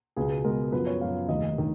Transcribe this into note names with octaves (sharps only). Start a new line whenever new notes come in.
C#2 B2 G#3 B3 G#4
C#2 B2 G#3 B3 A#4
F#2 F3 B3 B4
C#5
F#2 F3 B3 F5
F1 D#2 D#3 D#5
D#3